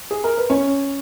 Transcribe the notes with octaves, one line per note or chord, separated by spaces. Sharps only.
G#4
A#4
B4
C#4 C#5